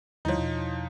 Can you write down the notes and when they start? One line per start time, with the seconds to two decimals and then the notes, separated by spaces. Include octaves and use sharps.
0.25 D#2 D3 F3 G3 D#4 E4 C#5
0.37 E2 B2